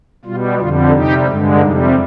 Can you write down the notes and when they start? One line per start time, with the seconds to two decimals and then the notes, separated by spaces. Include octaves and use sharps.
0.25 B2 G3 F4
0.58 F2 D3 G3 F4
0.93 C3 G3 D#4 G4
1.27 G2 D3 G#3
1.61 F2 C3 G3 D#4